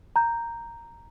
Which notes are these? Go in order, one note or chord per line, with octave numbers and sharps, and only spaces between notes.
A#5 G6